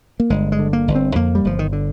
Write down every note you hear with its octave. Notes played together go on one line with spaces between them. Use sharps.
A#3
G1 G#3
G#3
D3
A#3
G1
C4
F2 A#3
G3
G1 F3
D#3
D3